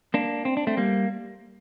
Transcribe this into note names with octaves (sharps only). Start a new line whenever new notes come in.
A#3 D4
C4
D4
A3 C4
G3 A#3